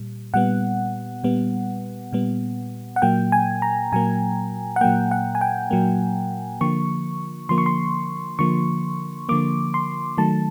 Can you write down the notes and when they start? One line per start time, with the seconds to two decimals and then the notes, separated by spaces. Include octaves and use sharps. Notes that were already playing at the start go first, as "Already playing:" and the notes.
Already playing: A#2 G3
0.34 A#2 G3 B3 F#5
1.24 A#2 G3 B3
2.12 A#2 G3 B3
2.96 F#5
3.02 A#2 F#3 A#3 G5
3.32 G#5
3.62 A#5
3.92 A#2 F#3 A#3 G#5
4.76 F#5
4.81 A#2 F#3 A#3 G5
5.11 F#5
5.35 G#5
5.41 G5
5.71 A#2 F#3 A#3
6.61 D3 F3 A#3 C#6
7.49 D3 F3 A#3 C6
7.58 C#6
7.66 C6
8.39 D3 F3 A#3 C#6
9.29 D3 F3 A#3 D6
9.74 C6
10.18 D#3 F#3 A3 A5